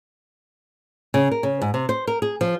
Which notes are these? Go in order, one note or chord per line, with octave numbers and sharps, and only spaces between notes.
C#3
A#4
C#3
G#2
C3
C5
A#4
G#4
F3